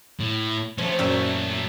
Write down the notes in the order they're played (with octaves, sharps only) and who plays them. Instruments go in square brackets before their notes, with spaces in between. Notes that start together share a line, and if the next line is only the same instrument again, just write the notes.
[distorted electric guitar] A2
[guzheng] F3 [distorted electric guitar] A3 C#4
[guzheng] F#2 A#2 E5